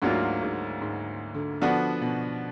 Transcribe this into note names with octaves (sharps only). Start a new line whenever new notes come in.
D2 G#2 D3 F#3 A#3 F4
G#2
G#2
D3
D3 F3 B3 D4 F#4
B2